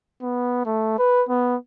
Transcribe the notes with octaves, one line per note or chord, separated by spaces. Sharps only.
B3
A3
B4
B3